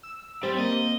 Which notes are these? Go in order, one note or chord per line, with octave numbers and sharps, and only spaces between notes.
E6
E6
G3 C4 G4 C5 A6
A#3 D#5